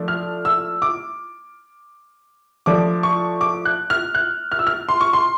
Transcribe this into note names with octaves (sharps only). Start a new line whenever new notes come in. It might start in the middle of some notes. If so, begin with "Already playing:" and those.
Already playing: F3 A3 D4
F6
E6
D6
F3 A3 D4 D6
C#6
D6
F#6
F6
F#6
F6
E6
F6
C6
C#6
C6